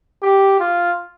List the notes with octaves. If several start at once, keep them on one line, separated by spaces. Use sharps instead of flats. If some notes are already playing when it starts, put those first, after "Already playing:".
G4
F4